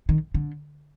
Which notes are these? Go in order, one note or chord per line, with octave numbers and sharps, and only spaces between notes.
D#3
D3